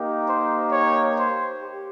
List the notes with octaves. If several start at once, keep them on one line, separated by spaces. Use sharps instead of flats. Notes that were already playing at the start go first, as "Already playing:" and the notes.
Already playing: A#3 D#4 G4
C5
C#5
C5
G4